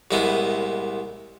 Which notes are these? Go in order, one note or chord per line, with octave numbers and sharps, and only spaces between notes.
C2 A#2 G#3 B3 E4